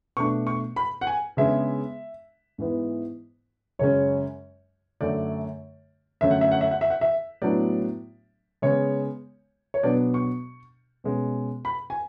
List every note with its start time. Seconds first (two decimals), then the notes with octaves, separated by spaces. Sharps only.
0.17 B2 A3 D4 C#6
0.47 C#6
0.76 B5
1.01 F#5
1.07 G#5
1.37 C#3 G#3 B3 D4 E5
2.58 G#2 E3 B3
3.79 F#2 C#3 G#3 C#4 C#5
5.01 F#2 D3 A3 D5
6.21 F#2 D3 A3 C#4 E5
6.31 F#5
6.41 E5
6.52 F#5
6.61 E5
6.71 F#5
6.81 E5
6.90 F#5
7.01 E5
7.42 A2 F#3 B3 D4 D5
8.62 C#3 G#3 B3 C#5
9.74 C#5
9.83 B2 F#3 B3 D4 D5
10.14 C#6
11.04 B2 G#3 C#4
11.65 B5
11.90 G#5